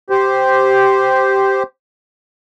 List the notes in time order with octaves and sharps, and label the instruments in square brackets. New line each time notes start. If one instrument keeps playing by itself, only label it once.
[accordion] G4 C5